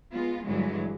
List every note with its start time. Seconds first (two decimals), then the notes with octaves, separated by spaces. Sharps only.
0.13 G#3 B3 F4
0.46 G2 D3 E3 F#3 G#3